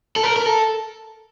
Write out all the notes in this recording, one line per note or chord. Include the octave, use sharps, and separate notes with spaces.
A4
A#4
A#4
A4